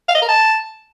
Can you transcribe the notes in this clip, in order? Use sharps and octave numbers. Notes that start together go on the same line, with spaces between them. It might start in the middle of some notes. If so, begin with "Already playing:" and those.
F5
D#5
A#4
A5